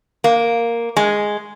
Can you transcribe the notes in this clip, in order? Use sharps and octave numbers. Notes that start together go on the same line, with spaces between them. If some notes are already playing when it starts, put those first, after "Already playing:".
A#3
G#3